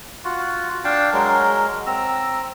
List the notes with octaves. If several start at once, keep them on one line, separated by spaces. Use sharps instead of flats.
F4 F#4
D4 F5 G5 A5
F#3 G#3 A#4
C4 A#5 E6